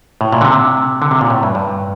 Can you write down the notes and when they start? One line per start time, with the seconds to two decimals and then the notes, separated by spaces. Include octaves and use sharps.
0.21 A2
0.32 A#2
0.41 D3
0.45 C3
1.02 D3
1.11 C3
1.21 A#2
1.30 A2
1.43 G2
1.55 G2